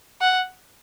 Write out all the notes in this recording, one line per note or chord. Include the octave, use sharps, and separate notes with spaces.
F#5